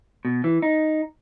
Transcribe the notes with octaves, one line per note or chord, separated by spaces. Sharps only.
B2
E3
D#4